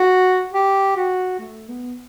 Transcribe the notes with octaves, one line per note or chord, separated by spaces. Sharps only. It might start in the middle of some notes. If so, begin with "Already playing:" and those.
Already playing: F#4
G4
F#4
A3
B3